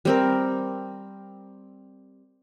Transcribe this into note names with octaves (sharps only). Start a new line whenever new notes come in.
G3 C4 A#4